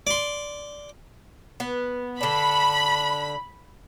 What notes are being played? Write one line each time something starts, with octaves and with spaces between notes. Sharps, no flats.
D5 C6
B3
D3 D4 B5